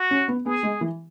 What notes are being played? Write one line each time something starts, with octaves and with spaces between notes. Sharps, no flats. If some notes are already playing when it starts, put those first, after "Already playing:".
Already playing: F#4
C#4
B3
B3 G#4
G#3
E3